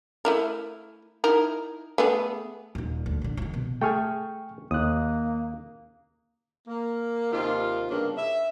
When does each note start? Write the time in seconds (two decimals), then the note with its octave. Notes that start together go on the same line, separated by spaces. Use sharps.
0.25 A3 E4 A#4
1.24 D#4 E4 A#4
1.98 A3 B3 G#4
2.75 D#1 D#4
3.06 D2
3.22 A#1 D3
3.37 D#3 F3
3.54 B2
3.81 A3 G#4 G5 G#5 C#6 F6
4.71 D#2 A#3 D#6 F#6
6.68 A#3
7.32 D#2 C3 D#3 F4
7.90 G2 C#3 A#3 B3 D4
8.17 E5